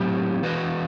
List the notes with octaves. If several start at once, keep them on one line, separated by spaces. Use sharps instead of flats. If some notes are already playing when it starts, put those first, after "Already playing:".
Already playing: A2 F#3 C4 E4 G4
E3 B3 F#4 B4 D#5